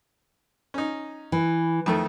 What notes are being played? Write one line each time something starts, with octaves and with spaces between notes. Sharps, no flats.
C#4 D#4
E3
F2 D#3 A3